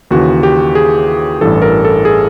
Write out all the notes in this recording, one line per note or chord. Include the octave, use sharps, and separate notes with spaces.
D#2 C#3 E3 F#4
G4
G#4
A1 G2 E3 A4
A#4
A4
G#4